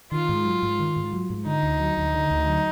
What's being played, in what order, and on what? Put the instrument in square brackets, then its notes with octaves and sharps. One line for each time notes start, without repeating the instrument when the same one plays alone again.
[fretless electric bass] D#3 [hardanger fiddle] F4
[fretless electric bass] G#2
F#3
G#2
D#3
G#2
F#3
G#2
[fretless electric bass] D3 [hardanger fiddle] D#4
[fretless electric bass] D2
F#3
D2
D3
D2
F#3